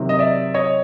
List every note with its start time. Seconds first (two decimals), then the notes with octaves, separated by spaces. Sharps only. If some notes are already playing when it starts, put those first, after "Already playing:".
Already playing: C3 D#3 F#3
0.09 D#5
0.19 D5 E5
0.54 C#5 D#5